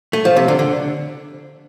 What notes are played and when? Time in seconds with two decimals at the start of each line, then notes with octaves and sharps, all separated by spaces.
0.13 A3
0.25 F3
0.36 C3
0.48 D3
0.59 D3